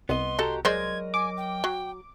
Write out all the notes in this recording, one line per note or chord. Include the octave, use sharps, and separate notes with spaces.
C2 B3 D#5 C6
F#4 G4 A4 D#5 A#5
F#3 G#3 A#4 C5 D5 D#5 G#6
G#5 D6
G5
F#3